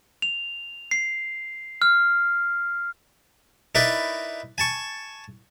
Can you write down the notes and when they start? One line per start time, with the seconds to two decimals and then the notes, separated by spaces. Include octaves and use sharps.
0.22 F7
0.91 C7
1.82 F6
3.75 D#4 E4 A#4 B4 D5
4.58 G#5 A5 C#6